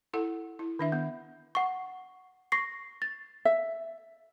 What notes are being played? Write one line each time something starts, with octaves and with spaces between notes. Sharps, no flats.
E4 A4 F#5
E4
D#3 D4 E5
B3
F#5 C#6
C#6 A#6 C7
A6
E5